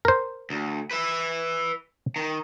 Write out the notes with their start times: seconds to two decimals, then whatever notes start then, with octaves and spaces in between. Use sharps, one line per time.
0.05 A#4 C5
0.50 D2
0.91 B4 E5
2.16 D#3